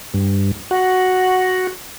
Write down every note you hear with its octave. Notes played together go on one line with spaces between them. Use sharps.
G2
F#4